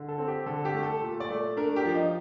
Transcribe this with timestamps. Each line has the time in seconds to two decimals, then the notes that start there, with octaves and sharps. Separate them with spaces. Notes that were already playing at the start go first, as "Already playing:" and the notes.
Already playing: D3
0.08 A4
0.18 C4
0.28 G4
0.46 D3 A4
0.65 G4
0.74 A3
0.83 A4
1.01 A#2
1.20 D5
1.30 A3
1.57 D4 A#4
1.76 G4
1.85 F3
1.95 D#4